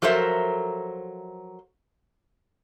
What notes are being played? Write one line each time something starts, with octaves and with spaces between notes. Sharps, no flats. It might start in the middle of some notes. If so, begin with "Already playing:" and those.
F3 F#3 A4 A#4 C5 E5